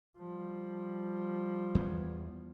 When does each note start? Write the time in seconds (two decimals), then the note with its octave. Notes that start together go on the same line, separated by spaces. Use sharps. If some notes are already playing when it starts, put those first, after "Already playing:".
0.18 F3 G3
1.75 E2 E3 B3